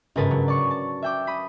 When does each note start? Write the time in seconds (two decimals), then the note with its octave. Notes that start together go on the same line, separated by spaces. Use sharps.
0.16 G1 G#2 C#3 A#4 B4 A5
0.31 F#3
0.48 D5 A5 C#6
0.71 A5
1.02 E5 G5 D6
1.27 B5 D#6